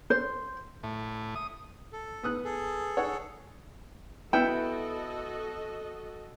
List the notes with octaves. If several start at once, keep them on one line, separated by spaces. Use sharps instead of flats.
C5
A2
D#6
A4
B3 D#6 F#6
G#4 A4
C#5 F#5 E6
B3 E4 F#4 A4 D#5 G5